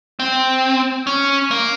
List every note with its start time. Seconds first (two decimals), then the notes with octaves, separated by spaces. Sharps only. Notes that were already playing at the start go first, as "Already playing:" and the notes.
0.20 C4
1.07 C#4
1.51 A#3